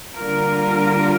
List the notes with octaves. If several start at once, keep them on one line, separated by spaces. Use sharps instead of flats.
D3 G3 A#3 F4 A#4